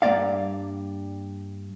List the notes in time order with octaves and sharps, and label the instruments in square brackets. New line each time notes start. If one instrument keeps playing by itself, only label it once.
[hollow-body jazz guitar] G2 F3 A#3 D5 F5